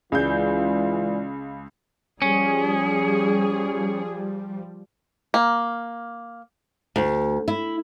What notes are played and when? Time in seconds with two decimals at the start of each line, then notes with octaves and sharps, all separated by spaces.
0.12 C#2 E3 G#3 F4 D5 G6
2.22 F3 G3 C#4 G#4
5.34 A#3
6.96 D2
7.48 E4